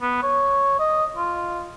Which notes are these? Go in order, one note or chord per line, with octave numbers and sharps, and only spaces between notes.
B3
C#5
D#5
F4